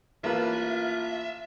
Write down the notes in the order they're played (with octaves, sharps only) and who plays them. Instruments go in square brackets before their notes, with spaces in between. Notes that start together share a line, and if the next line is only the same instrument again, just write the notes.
[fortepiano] A1 A#3 B4 [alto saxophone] F4 [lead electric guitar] E5